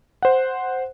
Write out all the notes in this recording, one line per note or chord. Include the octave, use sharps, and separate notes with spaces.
C5 F#5